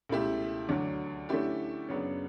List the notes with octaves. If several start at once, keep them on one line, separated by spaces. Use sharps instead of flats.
C#2 B2 A3 E4 G4
D2 D3 F#3
D3 A3 C#4 E4 G4
F#2 C#3 F#3 B3 D4